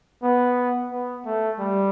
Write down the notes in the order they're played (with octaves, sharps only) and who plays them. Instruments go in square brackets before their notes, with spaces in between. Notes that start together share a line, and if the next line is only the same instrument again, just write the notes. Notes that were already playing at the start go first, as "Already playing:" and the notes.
[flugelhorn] B3
B3
A3
G3